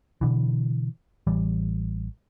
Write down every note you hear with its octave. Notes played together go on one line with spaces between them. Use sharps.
B2 D3 E3
A1 E3 G3